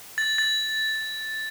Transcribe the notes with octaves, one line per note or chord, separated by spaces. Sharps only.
A6
A6